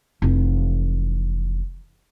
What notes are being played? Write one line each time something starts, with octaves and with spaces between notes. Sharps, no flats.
F1 E3